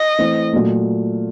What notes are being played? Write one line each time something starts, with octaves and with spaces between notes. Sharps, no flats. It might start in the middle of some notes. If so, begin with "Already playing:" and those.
Already playing: D#5
E3 A3 C4
A#2 F#3 A3